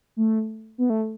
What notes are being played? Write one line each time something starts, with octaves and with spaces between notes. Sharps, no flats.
A3
B3
A3